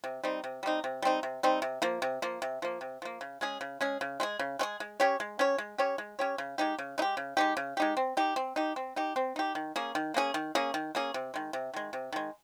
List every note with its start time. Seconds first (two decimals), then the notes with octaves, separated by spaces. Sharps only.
0.04 C3
0.24 G3 C4 D#4
0.44 C3
0.63 G3 C4 D#4
0.84 C3
1.02 G3 C4 D#4
1.23 C3
1.43 G3 C4 D#4
1.62 C3
1.82 F3 A#3
2.02 C3
2.22 F3 A#3
2.42 C3
2.62 F3 A#3
2.81 C3
3.02 F3 A#3
3.21 C#3
3.41 G#3 C#4 G#4
3.61 C#3
3.81 G#3 C#4 G#4
4.01 C#3
4.20 G#3 C#4 G#4
4.39 C#3
4.59 G#3 C#4 G#4
4.80 G#3
5.00 C#4 G4 C#5
5.20 G#3
5.39 C#4 G4 C#5
5.58 G#3
5.78 C#4 G4 C#5
5.98 G#3
6.19 C#4 G4 C#5
6.38 C#3
6.58 G#3 D#4 G4
6.79 C#3
6.98 G#3 D#4
7.02 G4
7.17 C#3
7.37 G#3 D#4 G4
7.57 C#3
7.77 G#3 D#4 G4
7.97 C4
8.17 D#4 G4
8.36 C4
8.56 D#4 G4
8.76 C4
8.96 D#4 G4
9.16 C4
9.36 D#4 G4
9.55 D#3
9.76 A#3 C#4 G#4
9.95 D#3
10.14 A#3 C#4 G#4
10.34 D#3
10.55 A#3 C#4 G#4
10.74 D#3
10.95 A#3 C#4 G#4
11.14 C3
11.34 D#3 G#3
11.53 C3
11.74 D#3 G#3
11.93 C3
12.13 D#3 G#3